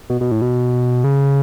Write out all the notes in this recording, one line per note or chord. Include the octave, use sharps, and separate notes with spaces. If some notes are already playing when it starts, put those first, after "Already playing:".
B2
B2
A2
B2
C#3